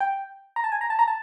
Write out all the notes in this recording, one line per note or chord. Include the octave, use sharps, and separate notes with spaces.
G5
A#5
A5
G#5
A#5
A5
A#5
A5